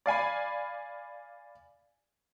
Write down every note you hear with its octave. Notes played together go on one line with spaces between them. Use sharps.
D5 F5 G#5 B5